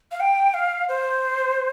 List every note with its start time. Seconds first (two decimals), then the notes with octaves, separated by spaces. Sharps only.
0.12 F5
0.20 G5
0.54 F5
0.88 C5